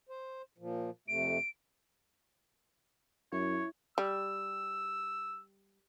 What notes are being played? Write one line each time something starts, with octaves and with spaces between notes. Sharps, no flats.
C5
A#2 F3
F2 C3 A3 D7
F#2 E4 C#5
G3 E6